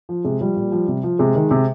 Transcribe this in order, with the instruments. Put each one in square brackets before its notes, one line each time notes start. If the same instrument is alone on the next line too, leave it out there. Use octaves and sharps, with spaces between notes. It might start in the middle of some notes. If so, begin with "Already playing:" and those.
[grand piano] F3
C3 G#3
F3 G3
A#2
F3
C3
F3
C3 G#3
D#3
C3